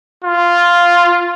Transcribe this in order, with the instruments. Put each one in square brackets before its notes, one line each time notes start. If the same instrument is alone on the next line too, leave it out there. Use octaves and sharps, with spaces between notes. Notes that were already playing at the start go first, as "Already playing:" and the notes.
[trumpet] F4